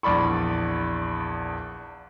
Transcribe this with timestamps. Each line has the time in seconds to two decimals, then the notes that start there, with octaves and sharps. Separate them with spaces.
0.03 A#1 E2 D5 B5 C#6